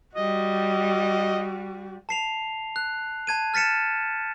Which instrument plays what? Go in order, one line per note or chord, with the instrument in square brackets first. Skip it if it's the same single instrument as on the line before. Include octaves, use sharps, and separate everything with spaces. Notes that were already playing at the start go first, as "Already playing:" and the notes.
[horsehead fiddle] G3 F#4 [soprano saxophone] D#5
[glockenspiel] A5 C7 F7
F#6
A5 G#6 D#7
F6 A6 B6 C#7 E7